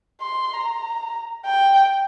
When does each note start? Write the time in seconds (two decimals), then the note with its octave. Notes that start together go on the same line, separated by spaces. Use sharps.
0.22 C6
0.53 A#5
1.46 G5